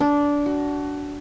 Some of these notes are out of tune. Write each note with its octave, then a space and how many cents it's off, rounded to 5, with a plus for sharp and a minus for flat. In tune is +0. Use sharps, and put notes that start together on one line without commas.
D4 -15
F#4 +20